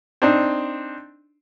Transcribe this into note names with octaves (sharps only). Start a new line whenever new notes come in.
C4 D4 D#4